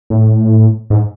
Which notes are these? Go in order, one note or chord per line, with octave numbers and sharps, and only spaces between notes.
A2
G#2